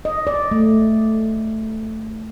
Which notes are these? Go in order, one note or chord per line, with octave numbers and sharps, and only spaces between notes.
D#5
D5
A3